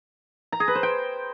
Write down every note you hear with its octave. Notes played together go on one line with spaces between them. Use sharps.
A#5
G#4
B4
C5
G5